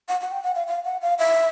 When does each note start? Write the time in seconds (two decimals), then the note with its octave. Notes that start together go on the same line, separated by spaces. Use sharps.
0.08 F#5
0.21 F#5
0.31 G5
0.43 F#5
0.55 F5
0.67 F5
0.85 F#5
1.02 F5
1.19 E5